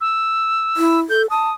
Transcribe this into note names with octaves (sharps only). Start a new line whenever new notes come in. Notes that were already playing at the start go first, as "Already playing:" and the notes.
E6
E4
A4 G6
A5 D#6